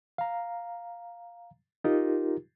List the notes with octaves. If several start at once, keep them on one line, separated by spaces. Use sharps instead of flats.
F5 A#5
D#4 F4 G4 A#4